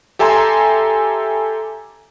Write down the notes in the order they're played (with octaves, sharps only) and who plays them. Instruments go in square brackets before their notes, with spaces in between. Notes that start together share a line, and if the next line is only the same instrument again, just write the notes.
[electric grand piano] G4 A4 E5 G#5 A#5 C6